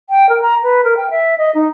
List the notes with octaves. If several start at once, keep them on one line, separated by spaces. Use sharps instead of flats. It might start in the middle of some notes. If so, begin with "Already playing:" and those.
G5
A#4
A#5
B4
A#4
G5
E5
D#5
D#4